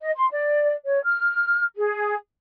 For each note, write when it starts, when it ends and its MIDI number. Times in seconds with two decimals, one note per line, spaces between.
0.01 0.12 75
0.15 0.26 84
0.31 0.74 74
0.85 0.99 73
1.04 1.64 89
1.76 2.16 68